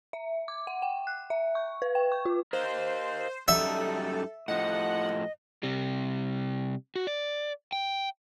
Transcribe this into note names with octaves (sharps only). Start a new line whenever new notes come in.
E5
D6
F#5
G5
F#6
E5
C#6
B4
G5
C#6
F4
A#4 C5 D#5 F5
F#2 G3 D#4 A4 E5
A2 F3 D#5 F#5
C3 G3
F#4
D5
G5